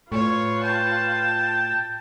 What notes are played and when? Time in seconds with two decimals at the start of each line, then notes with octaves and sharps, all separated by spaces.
0.12 A2 F4 B4 C#5 C#6
0.63 G5 A5